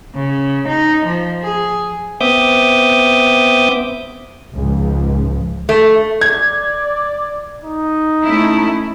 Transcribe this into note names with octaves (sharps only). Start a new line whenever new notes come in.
C#3
D#4
F3
G#4
B3 C4 E5 D6 D#6 G6
C#2 G#2 F3
A3
D5 G#6
D#4
A3 C#4 E4